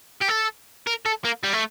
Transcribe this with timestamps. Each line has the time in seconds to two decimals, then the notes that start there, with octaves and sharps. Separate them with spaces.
0.21 G4
0.28 A4
0.87 A#4
1.06 A4
1.25 A#3
1.43 G3
1.53 A3